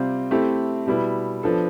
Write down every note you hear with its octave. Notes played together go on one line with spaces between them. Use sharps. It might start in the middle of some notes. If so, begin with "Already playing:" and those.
Already playing: C3 G3 C4 F4 C5
A3 C4 E4 G4
B2 G3 B3 E4
F3 B3 D4 A4